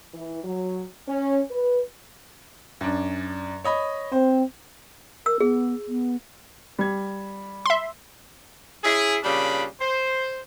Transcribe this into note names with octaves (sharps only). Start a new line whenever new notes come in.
E3
F#3
C#4
B4
F#2 D4
C#5 D#5 B5
C4 C5
A#4 E6
B3 G#4
B3
G3 G#6
E5 C6
C#4 E4 G#4
A#2 C#3 G3 D4 B5
C5